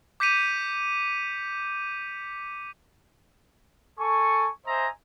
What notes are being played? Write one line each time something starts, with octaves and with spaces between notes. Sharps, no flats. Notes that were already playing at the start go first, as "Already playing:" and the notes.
D6 G6 B6 C#7 D#7 F7
A4 G#5 C#6
C5 D#5 E5 G#5 A#5